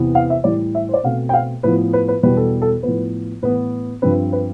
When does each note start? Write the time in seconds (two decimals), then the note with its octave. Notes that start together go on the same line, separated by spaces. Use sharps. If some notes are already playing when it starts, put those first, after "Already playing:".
Already playing: E2 C3 E3 B3
0.15 F5
0.30 E5
0.44 A2 E3 G3 D5
0.75 E5
0.89 C5
0.94 D5
1.04 B2 A3 C4 F5
1.29 G5
1.33 F5
1.63 A2 F3 B3 B4
1.93 B4
2.08 B4
2.23 E2 B2 G3 B3 B4
2.37 A4
2.62 A4
2.83 A2 F3 B3 B4
3.43 A2 E3 B3 B4
4.02 G2 F3 C4 B4
4.33 B4